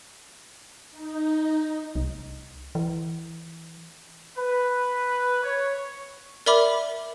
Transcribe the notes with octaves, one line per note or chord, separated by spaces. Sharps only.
D#4
C2
E3
B4
C#5
A#4 D5 E5 B5 D6